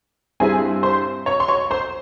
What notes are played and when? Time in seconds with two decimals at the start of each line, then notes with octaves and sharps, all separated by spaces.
0.40 G2 G3 C4 E4 G#4 G#5
0.83 C5 C6
1.26 C#5 C#6
1.40 C6
1.48 C#5 C#6
1.71 C5 C6